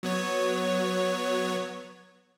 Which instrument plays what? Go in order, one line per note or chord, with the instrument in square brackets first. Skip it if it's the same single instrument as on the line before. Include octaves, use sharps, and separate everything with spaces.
[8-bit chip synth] F#3 B3 C#5